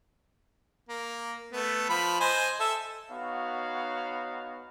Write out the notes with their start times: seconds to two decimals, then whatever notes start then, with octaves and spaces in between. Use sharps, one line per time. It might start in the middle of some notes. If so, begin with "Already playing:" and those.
0.89 A#3
1.52 A3 B3
1.89 F3 B5
2.20 C5 D#5 G#5
2.60 A4 E5
3.11 B3 D#4 F#4 C#5 F5